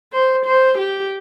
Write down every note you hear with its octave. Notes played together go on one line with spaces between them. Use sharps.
C5
C5
G4